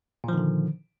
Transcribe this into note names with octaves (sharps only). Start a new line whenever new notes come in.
A#2 D3 D#3 F3